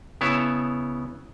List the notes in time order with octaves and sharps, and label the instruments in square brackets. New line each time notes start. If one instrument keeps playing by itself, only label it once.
[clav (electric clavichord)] C#3 B3 E4 C#5 A5